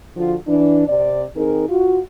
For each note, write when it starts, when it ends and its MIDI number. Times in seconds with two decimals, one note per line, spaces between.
0.16 0.35 50
0.16 0.35 53
0.16 0.35 65
0.16 0.35 66
0.47 0.85 52
0.47 0.85 62
0.87 1.25 48
0.87 1.25 60
0.87 1.25 74
1.35 1.67 51
1.35 1.67 60
1.35 1.67 63
1.35 1.67 68
1.35 1.67 70
1.69 2.00 65
1.69 2.00 66